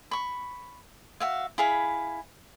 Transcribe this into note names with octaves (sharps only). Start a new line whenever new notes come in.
B5 C#6
F#4 E5 F5
E4 G#4 F5 B5